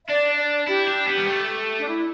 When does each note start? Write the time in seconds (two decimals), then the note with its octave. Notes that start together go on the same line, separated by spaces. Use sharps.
0.05 E5
0.08 D4 D5
0.39 D5
0.67 E4 G4
0.88 D4
1.08 B3
1.18 G3
1.27 A3
1.79 D4
1.87 E4